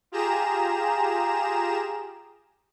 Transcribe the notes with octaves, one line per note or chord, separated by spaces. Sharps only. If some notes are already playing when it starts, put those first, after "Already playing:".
F4 G4 G#4 A#5 E7